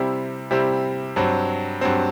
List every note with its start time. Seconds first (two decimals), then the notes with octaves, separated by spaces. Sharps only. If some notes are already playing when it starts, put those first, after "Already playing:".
Already playing: C3 G3 C4 E4 G4
0.51 C3 G3 C4 E4 G4
1.16 G2 F#3 C4
1.81 G2 F#3 C4